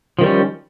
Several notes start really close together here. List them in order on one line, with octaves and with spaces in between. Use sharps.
F3 D#3 G3 C#4